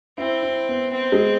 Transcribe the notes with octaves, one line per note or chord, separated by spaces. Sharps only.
C4 E4
E4
B3
C4
G#3